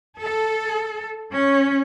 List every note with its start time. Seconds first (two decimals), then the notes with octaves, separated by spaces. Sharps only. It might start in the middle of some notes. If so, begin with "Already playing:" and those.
0.19 A4
1.30 C#4